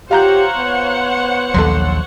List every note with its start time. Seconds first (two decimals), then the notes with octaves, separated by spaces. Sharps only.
0.11 F4 G4 C5 C#5 F#5 A#5 G6
0.58 B3
1.54 A#1 D#2 F#3 A4 C6